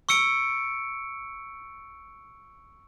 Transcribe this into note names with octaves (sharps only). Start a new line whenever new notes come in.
C#6 E6 C#7 D7